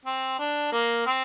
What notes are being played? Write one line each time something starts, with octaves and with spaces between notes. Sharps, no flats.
C4
D4
A#3
C4